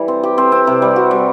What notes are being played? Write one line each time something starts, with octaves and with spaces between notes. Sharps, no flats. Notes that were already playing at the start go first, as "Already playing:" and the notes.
Already playing: E3 G3
C4
G4
C4
C4
C3
G3
F#4
G3